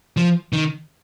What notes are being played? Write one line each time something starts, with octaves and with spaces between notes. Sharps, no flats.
F3
D#3